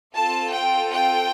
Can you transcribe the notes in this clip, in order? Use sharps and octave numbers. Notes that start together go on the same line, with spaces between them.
C4 F4 A4 A5
G5
G5